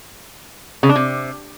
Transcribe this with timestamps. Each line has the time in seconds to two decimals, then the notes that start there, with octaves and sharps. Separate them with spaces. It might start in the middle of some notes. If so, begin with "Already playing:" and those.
0.83 C#3
0.89 D4
0.96 C3